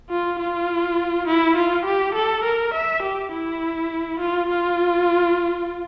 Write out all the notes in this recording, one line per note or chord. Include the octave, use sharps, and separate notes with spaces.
F4
F4
E4
F4
G4
A4
A#4
E5
G4
E4
F4
F4